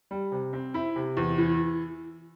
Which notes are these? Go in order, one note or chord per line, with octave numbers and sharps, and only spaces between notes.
G3
C3
C4
E4
C3
E2
E3